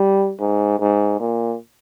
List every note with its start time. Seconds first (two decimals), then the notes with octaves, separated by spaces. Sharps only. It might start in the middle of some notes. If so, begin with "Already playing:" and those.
Already playing: G3
0.40 G#2
0.79 G#2
1.20 A#2